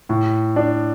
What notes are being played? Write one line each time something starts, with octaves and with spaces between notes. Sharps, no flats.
A2
D4